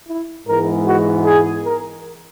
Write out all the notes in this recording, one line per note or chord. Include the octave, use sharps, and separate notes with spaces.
E4
G#2 E3 G#3 B3 A#4
F#4
G#4
A#4